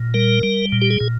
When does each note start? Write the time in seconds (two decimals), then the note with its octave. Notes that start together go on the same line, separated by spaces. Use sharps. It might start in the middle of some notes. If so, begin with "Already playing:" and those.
Already playing: A#2
0.14 G3 A#4
0.43 G3
0.72 A#2
0.82 G4
0.91 G#4
1.00 A#2